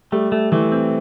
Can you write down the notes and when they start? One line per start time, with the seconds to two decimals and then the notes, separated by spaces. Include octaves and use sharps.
0.12 G3 A3
0.32 A3
0.52 E3 A3
0.72 C4